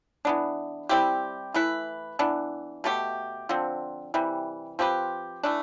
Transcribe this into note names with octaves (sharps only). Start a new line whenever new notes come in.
E3 B3 D4
G3 C4 E4 G4
E3 A3 E4 B4
E3 B3 D4
B2 A3 E4 G4
D3 F3 C4
C3 E3 G3
F3 C4 G4 B4
E3 A3 D4